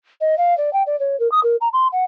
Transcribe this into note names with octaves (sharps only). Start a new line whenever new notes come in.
D#5
F5
D5
G5
D5
C#5
A#4
D#6
A#4
A#5
C6
F#5